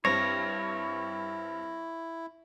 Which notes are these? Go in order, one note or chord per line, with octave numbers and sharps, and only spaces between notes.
G2 C4 E4 C#5 A#6